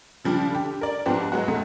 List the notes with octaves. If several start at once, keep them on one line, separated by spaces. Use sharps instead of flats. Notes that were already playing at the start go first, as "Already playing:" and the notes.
C#3 F3 G3 D4
D3 G4
A#4 D5
G#2 F3 B3 C4 D4 G4
F#3 G#3 B3 F#4
F2 B2 G#3 A3